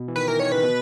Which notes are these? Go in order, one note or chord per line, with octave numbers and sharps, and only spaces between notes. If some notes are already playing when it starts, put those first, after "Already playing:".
Already playing: B2
E3
D#3 B4
E3 A#4
D#3 C#5
C#3 B4
B2